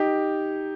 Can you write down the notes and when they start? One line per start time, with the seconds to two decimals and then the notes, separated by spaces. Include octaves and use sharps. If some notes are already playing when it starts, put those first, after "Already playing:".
Already playing: D#4 G4